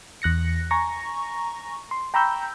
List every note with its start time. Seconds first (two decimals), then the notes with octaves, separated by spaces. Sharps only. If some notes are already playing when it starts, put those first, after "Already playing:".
0.22 E2 F#6 A#6 C#7
0.71 G#5 A#5 C#6 A#6
1.91 C6
2.14 G5 A#5 B5 C#6 E6 G6